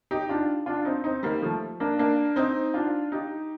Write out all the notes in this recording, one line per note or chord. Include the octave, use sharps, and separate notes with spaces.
D#4 G4
D4 F4
D4 F4
C4 D#4
C4 D#4
G3 A#3
F3 A3
A#3 D4
A#3 D4
C4 D#4
D4 F4
D#4 G4